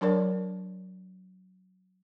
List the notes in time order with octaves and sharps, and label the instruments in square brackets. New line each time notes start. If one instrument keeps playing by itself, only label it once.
[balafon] F#3 D4 A#4 C#5 D5